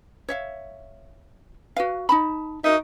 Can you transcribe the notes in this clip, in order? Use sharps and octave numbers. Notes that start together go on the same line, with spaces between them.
C#5 E5 F5
F#4 B4 F5
D#4 A5 B5
D#4 F#4 A#4 E5